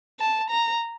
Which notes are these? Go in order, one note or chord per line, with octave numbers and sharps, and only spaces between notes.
A5
A#5